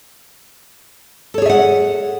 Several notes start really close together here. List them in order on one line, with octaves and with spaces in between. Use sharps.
A4 C#5 G#4 E5 F#5